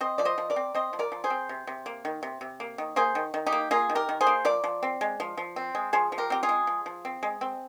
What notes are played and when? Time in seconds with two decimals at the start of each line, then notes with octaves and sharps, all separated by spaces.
0.01 C4 C5 D#5
0.18 F3 D5
0.25 C5 D#5
0.38 F3
0.50 A#4 D5
0.56 C4
0.75 C4 C5 D#5
0.93 F3
0.99 A#4 D5
1.12 F3
1.24 G#4 C5
1.30 C4
1.49 C3
1.67 C3
1.86 A#3
2.05 D#3
2.23 C3
2.41 C3
2.60 A#3
2.78 D#3
2.96 A#3 G#4 C5
3.15 D#3
3.34 D#3
3.46 D#4 G4
3.52 A#3
3.71 A#3 F4 G#4
3.90 D#3
3.95 G4 A#4
4.09 D#3
4.21 G#4 C5
4.27 A#3
4.45 F3 A#4 D5
4.64 F3
4.83 C4
5.01 G#3
5.20 F3
5.37 F3
5.56 C4
5.75 G#3
5.93 F3 G#4 C5
6.12 F3
6.18 G4 A#4
6.30 C4 G4
6.43 F4 G#4
6.49 G#3
6.67 F3
6.86 F3
7.05 C4
7.23 G#3
7.41 C4